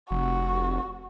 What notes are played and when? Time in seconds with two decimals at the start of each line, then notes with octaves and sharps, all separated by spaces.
0.11 F1 F#4